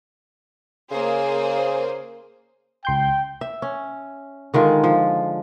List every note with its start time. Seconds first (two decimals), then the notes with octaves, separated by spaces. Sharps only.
0.91 C#3 A#3 G#4 C5
2.85 C#2 G5 C6 G6
3.41 E5
3.62 C#4
4.54 D3 D#3 G#3 F4
4.84 F3